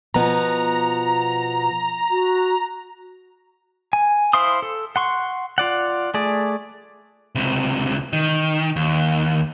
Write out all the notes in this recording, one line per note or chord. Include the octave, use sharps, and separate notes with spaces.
B2 F3 B3 A#5
F#4
G#5
E4 C5 F5 C6 D#6
A4
F#5 C6 C#6
F4 D5 F#5
A3 G#4 D5
C#2 C3
D#3
D#2